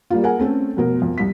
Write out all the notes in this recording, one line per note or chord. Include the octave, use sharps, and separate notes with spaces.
G3 A#3 F4
G#4 A#4 F#5 G#5
A3 C4 C#4 A4
F1 B2 A#4
F2
C2 B6